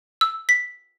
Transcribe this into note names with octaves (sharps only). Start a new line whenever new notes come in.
E6
B6